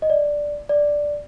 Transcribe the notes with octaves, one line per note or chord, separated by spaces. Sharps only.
D#5
D5
D5